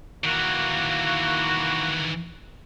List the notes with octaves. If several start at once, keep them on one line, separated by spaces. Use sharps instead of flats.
D#3 E3 A#3 F#4